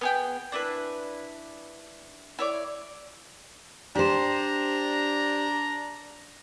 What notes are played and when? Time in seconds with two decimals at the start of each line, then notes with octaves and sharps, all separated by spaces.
0.01 B3 G#4 G5
0.52 D4 E4 B4
2.39 E4 C#5 D5
3.95 D4 G4 C5 D5 A#5